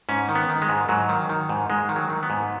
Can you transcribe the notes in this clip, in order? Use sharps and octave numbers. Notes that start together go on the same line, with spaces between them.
G#2 C#4
D#3
B3
D#3
G#3
G#2
G#2 F#3
D#3
D#3
G#2
G#2 G#3
D#3
F#3
D#3
B3
G#2